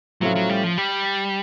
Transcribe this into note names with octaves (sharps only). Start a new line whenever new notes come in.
A2 F3 F#3 A3 C#4 F4
F#3
G3
F3
G3